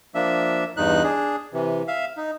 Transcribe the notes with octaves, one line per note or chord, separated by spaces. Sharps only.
F3 A#3 D4 E5
E2 G2 D#4 F#6
D4 G#4
C3 E3
E5 F5
D#4